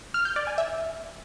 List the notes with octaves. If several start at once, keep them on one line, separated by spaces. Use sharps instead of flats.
F6
G6
D5
G#5
E5